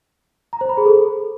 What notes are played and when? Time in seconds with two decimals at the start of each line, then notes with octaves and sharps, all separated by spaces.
0.53 A#5
0.61 C5
0.69 B5
0.77 G#4
0.86 A4